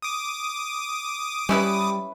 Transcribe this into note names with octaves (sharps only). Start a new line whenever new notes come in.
D6 D#6
G3 C#4 E4 B4